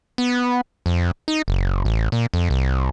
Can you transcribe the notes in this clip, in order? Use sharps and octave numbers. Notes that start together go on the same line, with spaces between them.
B3
F2
D#4
F#1
A1
A#2
F2
C2